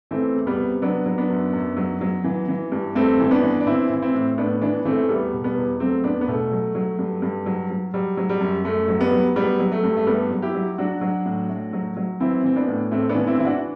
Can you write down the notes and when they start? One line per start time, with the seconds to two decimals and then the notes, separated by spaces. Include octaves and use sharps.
0.11 E3 A3 C4
0.35 E2
0.47 G3 B3
0.58 C3
0.82 F#3 B3 D4
1.06 F#3
1.18 B3 D4
1.30 F#2
1.53 F#2
1.77 F#3
2.01 F#3
2.24 E3
2.48 E3
2.72 G2
2.95 G2 A3 C4
3.20 E3 C4
3.31 B3 D4
3.43 E3
3.60 D4
3.66 E3 C4 E4
3.90 E3
4.02 C4 E4
4.14 A2
4.38 A2 B3 D4
4.61 E3 B3 D4
4.85 E3 A3 C4
4.97 A3
5.09 E2 G3 B3
5.33 B2
5.44 G3 B3
5.57 E2
5.80 F#3 A3 C4
6.04 E2 B3 D4
6.21 B3
6.28 B2 A3
6.51 F#3
6.75 F#3
6.99 G2
7.22 G2
7.46 F#3
7.70 F#3
7.94 F#3 G3
8.17 F#3
8.29 G3
8.41 F#2
8.65 F#2 A3
8.88 F#3
9.00 G3 B3
9.12 F#3
9.36 F#3 G3 B3
9.59 F#3
9.72 A3
9.83 G2
9.97 A3
10.07 G2 G3 B3
10.31 F#3
10.42 E4 G4
10.55 F#3
10.78 F#3 D4 F#4
11.01 F#3
11.26 A2
11.50 A2
11.73 F#3
11.97 F#3
12.20 E3 C4 E4
12.44 E3 C4
12.56 B3 D4
12.68 A2
12.91 A2 A3 C4
13.09 B3 D4
13.15 E3
13.27 C4 E4
13.39 E3 E4
13.45 D4 F#4